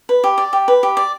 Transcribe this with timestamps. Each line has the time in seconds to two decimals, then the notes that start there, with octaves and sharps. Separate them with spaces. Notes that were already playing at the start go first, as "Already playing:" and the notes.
0.09 B4
0.24 G4
0.38 D5
0.53 G4
0.68 B4
0.83 G4
0.97 D5